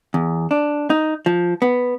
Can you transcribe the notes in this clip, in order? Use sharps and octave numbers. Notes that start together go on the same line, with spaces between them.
E2
D4
D#4
F3
B3